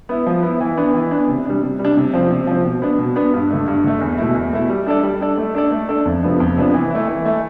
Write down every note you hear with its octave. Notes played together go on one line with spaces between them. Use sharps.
B3 E4
F3
B3 E4
E3
B3 D4
E3
B3 D4
C3
G3 D4
C3
G3
D4
C3
F3 C4
C3
F3 C4
B2
B3 D4
B2
B3 D4
G2
D3 A3
G2
D3 A3
E2
B2 A3 E4
E2
B2 A3 E4
G3
D4 A4 D5
G3
D4 A4 D5
A3
D4 A4 D5
A3
D4 A4 D5
F2
C3 F3 B3 D4
F2
C3 F3 B3 D4
E3
A3 E4
E3
A3 E4